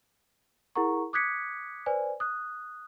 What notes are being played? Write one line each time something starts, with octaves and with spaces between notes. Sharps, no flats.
E4 G#4 A#4 F#5 A#5 C#6
D6 D#6 F#6 G#6 B6 C#7
B4 C5 D5 G#5
D#6 F#6